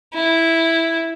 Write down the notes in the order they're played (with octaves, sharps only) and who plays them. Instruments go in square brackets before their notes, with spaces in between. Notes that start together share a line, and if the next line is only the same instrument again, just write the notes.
[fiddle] E4